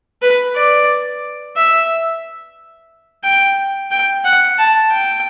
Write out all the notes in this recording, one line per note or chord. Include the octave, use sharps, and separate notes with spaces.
B4
D5
E5
G5
G5
F#5
A5
G5